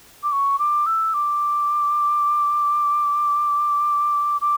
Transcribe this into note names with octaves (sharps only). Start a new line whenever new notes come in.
D6
C#6
D6
E6
D6
D6